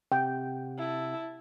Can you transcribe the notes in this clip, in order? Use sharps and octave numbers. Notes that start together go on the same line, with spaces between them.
C3 F#5 G5
E4 A5